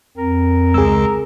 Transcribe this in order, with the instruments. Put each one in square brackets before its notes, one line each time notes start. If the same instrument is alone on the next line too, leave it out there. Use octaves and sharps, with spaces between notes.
[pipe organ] F2 C4 [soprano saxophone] A#4
[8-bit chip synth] C#2 C#3 G#3 [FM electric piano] G#4 E6